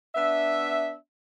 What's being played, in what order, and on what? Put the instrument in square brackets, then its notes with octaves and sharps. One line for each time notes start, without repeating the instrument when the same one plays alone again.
[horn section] B3 D4 E5